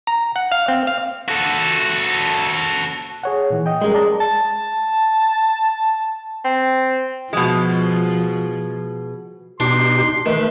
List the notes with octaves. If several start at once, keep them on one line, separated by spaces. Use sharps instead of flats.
A#5
F#5
F5
C4
F5
F#4 A4
G#4 C#5 F#5
A#2 E3
D#5 G5
G3 G#3 C#4 A#4
D5 A5 A#5
A5
C4
B2 F3 G#3
B2 D4 D#4 G4 C6
D#3 A3 B4